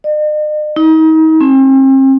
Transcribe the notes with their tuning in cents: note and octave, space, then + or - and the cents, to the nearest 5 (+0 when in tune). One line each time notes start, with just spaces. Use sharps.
D#5 -45
D#4 +35
C4 +40